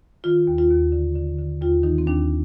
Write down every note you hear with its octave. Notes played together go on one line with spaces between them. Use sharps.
D#3 F4
D#2
F4
D#2
D3
D3
D3
D#2 F4
D#3 D#4
C4
D#2 D4